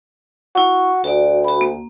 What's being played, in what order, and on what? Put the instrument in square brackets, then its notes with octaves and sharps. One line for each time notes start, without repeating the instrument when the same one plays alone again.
[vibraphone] E4 C#6 [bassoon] F#4
[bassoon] D2 [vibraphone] F#4 D5
[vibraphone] F#4 B5
A#3